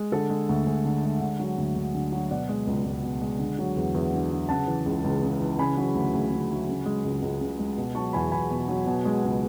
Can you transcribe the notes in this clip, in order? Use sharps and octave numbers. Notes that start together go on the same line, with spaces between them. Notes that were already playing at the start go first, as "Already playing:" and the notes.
Already playing: G#3
D3 A4
G#3
D2
D2 G#4
D3
G#3
D3
F#3
D2
D2
D3
F#3
B2 D5 F#5
G#3
C#2
C#2
B2
G#3
D3
F#3
E2
E2
D3
F#3
C#3 F#5 A5
E3
C#2
C#2
C#3
E3
C#3 G#5 B5
F#3
D2
D2
C#3
F#3
C#3
G#3
C#2
C#2
C#3
G#3
B2
F#3 A5 C#6
E2 G#5 B5
E2 G#5 B5
B2
F#3
B2
G#3
C#2